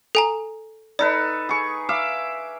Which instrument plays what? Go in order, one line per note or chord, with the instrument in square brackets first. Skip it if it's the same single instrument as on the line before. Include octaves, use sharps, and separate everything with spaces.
[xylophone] A4 G#5 A#5
[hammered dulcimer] D#4 A4 B4 [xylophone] D5
[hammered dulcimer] G#4 C#6
E5 F5 D6